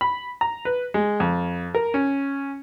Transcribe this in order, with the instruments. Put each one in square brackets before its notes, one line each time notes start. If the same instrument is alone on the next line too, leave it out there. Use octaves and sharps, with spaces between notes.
[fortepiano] B5
A#5
B4
G#3
F2
A#4
C#4